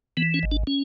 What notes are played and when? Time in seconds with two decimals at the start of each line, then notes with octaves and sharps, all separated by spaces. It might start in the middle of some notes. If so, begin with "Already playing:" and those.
0.17 E3 B3
0.34 C#4
0.43 G#1
0.52 D4
0.67 C#4